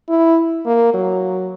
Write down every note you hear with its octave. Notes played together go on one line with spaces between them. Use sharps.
E4
A#3
F#3